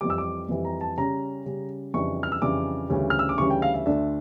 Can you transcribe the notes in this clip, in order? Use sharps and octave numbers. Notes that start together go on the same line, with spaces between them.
F2 E3 G3 D6
E6
D6
F2 E3 G3
A#5
A5
C#3 G3 C#4 A#5
C#3 G3 C#4
F2 C#3 E3 G3 D4 C#6
F6
E6
F2 C#3 E3 G3 D4 D6
D2 C#3 E3 G3 C#4
F6
E6
D6
D2 C#3 E3 G3 C#4 C#6
G5
F5
E5
D2 D3 A3 D4 E5